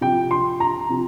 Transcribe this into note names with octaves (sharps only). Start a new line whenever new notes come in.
C3 F3 G5
C6
A#5
C3 F3